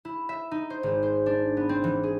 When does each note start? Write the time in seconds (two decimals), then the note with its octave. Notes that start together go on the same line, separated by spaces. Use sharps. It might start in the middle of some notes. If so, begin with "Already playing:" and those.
0.05 E4
0.29 E5
0.51 D#4
0.70 C5
0.83 G#1
1.03 C5
1.26 D4
1.57 B3
1.69 C4
1.84 E3
2.03 G#4